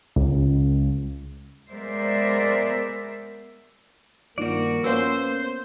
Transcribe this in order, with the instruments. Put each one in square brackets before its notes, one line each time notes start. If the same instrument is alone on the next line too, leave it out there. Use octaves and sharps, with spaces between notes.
[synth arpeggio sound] C#2
[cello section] G#3 B3 A#4 C5 D5 E5
[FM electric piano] G2 D#3 F3 [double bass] A#3 [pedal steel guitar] F#4 D5
[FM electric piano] B3 C#4 F4 [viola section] C5 [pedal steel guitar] E6